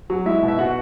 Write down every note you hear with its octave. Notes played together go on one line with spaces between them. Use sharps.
F#3
G#3 E4 E5
B2
E5
B2 F#4 F#5